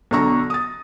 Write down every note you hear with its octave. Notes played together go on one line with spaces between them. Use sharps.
B1 D3 A#5 C#6 A#6
D#6 A6